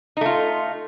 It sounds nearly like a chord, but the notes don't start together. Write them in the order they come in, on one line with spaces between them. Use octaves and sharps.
D#4 A3 F4